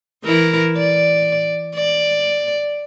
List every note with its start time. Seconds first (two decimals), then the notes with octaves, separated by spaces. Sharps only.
0.24 E3 E4 A#4
0.78 D5
1.76 D5